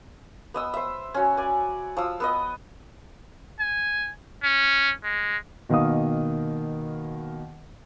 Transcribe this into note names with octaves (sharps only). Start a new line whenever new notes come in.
B3 D#5 E6
C5 E5
C#4 F#4
D5 G#5
F3 D#6 E6
B3 B4 D#5
G#5
C#4
G#3
B2 D#3 A#3 F5 D#6